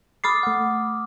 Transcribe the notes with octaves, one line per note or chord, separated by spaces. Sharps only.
B5 D6 D#6 F6 A6 C7
A3 F#5